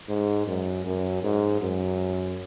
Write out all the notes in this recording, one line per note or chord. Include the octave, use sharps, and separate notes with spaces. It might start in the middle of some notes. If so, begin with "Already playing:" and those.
G#2
F#2
F#2
G#2
F#2